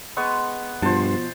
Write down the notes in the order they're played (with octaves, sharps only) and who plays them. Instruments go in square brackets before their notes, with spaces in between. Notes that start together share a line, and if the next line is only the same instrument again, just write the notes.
[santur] G#3 B3 C#6
[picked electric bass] G2 [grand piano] B2 F3 [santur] C5 A5